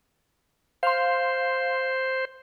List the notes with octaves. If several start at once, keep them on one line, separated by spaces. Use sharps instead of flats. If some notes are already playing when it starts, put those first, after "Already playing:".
C5 F5 C6